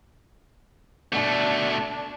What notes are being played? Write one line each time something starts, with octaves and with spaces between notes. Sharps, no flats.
B2 A3 D4